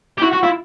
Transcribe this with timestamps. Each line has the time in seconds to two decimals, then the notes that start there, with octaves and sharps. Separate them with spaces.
0.18 G4
0.21 E4 F#4
0.33 F#4
0.43 E4 F4